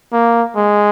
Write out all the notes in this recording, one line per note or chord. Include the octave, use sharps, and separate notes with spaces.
A#3
G#3